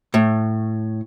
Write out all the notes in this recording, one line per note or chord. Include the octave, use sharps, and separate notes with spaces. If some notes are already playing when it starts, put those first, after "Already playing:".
A2